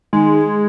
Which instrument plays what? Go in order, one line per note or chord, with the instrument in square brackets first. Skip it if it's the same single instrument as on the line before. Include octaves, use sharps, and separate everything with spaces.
[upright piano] D#3 [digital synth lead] G#3